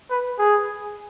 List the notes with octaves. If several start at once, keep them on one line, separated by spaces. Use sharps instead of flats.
B4
G#4